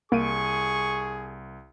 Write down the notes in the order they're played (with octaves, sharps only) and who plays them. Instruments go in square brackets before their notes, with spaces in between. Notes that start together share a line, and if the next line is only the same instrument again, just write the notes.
[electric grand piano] C2 D7 D#7 [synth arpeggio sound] A#3 [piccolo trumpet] G#4 [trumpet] C#6